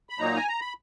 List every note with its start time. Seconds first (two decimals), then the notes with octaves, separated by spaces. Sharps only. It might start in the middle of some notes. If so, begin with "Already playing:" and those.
0.09 B5
0.19 A#2 F#3 A#3 D#4 A#5
0.36 G#5
0.48 A#5
0.61 B5